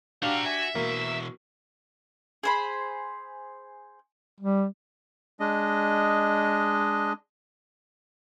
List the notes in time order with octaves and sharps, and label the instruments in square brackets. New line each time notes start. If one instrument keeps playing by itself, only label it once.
[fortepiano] D4 G4 [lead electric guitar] F#4 [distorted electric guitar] C5 A#5 [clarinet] F5
[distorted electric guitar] E5 [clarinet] G#5
[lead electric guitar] B2 E3 [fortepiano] A#3 [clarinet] F#4
[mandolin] G#4 C5 B5
[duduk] G3
[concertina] G#3 D4 D#5